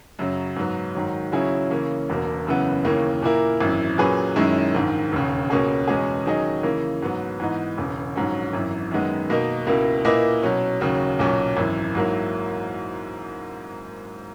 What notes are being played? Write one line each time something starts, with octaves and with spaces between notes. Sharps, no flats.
F#2 C#3 F#3
G#2 F#3 B3
G#2 D#3 F#3
C#3 F#3 C#4 E4 G#4
C#3 E3 A#3 C#4
E1 E2 B2 A#3
F#1 F#2 C#3 E3 B3
D#2 C#3 E3 A#3 C#4
A#2 A#3 E4 A#4
G#1 F#2 E3
A#2 F#3 C#4 G#4 B4
F#2 D#3 G#3 C#4 E4
A#1 G#2 D#3
E1 D#2 C#3
C#2 B2 A#3 C#4 G#4
E2 B2 G#3 C#4 G#4
D#3 F#3 C#4 G#4 D#5
C#3 E3 A#3
G#2 F#3 B3
G#2 E3 B3 D#4
E1 E2 C#3
A#1 G#2 F#3 C#4
G#1 F#2 E3
F#2 D#3 G#3 B3
B2 A#3 D#4 A#4
C#2 B2 A#3 E4
A#2 A#3 E4 B4 D#5
B2 F#3 C#4
D#2 C#3 F#3
B1 A#2 F#3 C#4
G#1 F#2 E3
G#2 F#3 A#3 E4